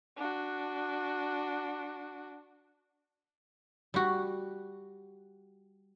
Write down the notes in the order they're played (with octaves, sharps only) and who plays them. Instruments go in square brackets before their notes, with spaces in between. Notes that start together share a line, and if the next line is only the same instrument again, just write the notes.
[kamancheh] D4 F#4
[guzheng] G3 F#4